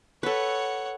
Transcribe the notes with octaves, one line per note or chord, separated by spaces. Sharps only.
A4 B4 C#5 F#5